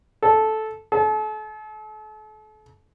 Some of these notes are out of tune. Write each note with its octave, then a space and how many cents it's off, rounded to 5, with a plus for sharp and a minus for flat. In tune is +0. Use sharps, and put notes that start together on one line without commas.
A4 -10
A4 -40